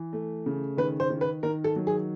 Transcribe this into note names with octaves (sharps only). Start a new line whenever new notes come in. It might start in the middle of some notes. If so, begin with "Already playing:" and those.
Already playing: E3
A3
C#3
D#3 B4
C5
D#3
B4
D#3 A#4
A4
F#3
G#4